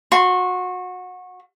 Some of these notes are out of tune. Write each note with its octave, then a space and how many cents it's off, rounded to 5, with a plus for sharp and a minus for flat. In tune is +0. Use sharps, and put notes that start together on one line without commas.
F#4 -25 C6 +0